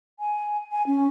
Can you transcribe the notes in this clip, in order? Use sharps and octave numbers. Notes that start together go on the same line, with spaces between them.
G#5
G#5
C#4